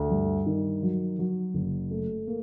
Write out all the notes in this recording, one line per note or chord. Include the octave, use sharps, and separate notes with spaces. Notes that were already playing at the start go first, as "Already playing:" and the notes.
Already playing: D2
G2
D#3
F#3
F#3
F#1
A3
A#3